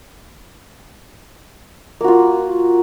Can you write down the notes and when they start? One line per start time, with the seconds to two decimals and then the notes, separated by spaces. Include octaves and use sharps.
2.01 A#3
2.04 F#4
2.08 F4